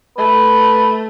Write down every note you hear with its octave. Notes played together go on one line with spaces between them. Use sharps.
A3 B4